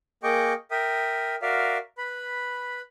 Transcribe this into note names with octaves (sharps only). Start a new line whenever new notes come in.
A#3 G#4 D#5 G5 C#6 D6
A#4 E5 G5 D#6
F#4 A#4 D5 E5 F5
B4 B5